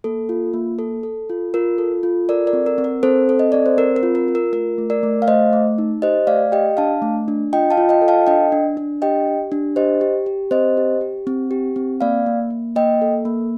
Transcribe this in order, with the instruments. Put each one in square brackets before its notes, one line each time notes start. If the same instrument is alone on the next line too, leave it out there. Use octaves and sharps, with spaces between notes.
[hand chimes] A#3 A4
F4
A#3
A4
A4
F4
F4 A#4
A4
F4
A4 A#4 D5
A#4 D5
C4
A#4
C4
A#4
C4 A4 C5
A4
D#5
C4 D5
C5
C4 A#4
A#4
F4
A#4
F4
A#4
A3 A#4
A3
A#4 D5
A3
F5
A3 C5 D#5
A3
D#4
G4 C5 D#5
A3 D5 F5
G4 D#5 G5
D4 F5 A5
A3
D4
F4 D#5 G5
F5 A5
F4
D#5 G5
A4
F5 A5
D4 D#5 G5
D4
D4
G4 D#5 G5
G4
D4
G4 C5 D#5
G4
G4
C4 C5 D#5
G4
G4
C4
G4
C4
A#3 D5 F5
A#3
A#3
A#3 D#5 G5
A4
A#3